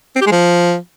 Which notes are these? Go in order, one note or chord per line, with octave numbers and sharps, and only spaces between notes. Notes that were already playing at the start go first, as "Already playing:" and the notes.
C4
G4
G#3
F3